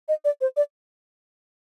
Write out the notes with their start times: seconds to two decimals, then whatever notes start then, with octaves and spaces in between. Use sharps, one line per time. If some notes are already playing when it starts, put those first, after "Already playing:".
0.08 D#5
0.25 D5
0.41 C5
0.57 D5